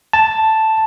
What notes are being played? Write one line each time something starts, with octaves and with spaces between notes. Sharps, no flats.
A5